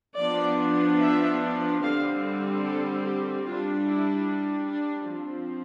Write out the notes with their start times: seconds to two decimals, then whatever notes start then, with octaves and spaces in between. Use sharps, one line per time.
0.17 F3 B3 D4 D5
1.00 E5
1.81 D3 G3 C4 F5
2.63 A4
3.04 G4
3.45 G3 D4 F4
3.86 E4
4.67 D4
5.09 F3 C4